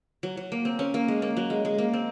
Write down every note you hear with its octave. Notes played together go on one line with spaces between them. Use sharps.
F#3
F#3
A#3
C4
C#4
A#3
G#3
A#3
F#3
G#3
G#3
A#3
C4